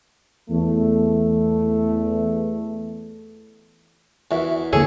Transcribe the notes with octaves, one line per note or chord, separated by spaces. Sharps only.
E2 A3
E2 F#4 A#4 E5
F2 D3 A#3 G#4 A4 C#5